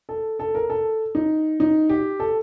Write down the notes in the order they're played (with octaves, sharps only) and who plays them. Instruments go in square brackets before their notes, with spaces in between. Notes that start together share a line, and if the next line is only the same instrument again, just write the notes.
[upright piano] A4
A4
A#4
A4
D#4
D#4
G4
A4